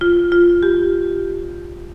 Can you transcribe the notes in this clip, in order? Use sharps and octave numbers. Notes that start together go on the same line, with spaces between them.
F4
F4
G4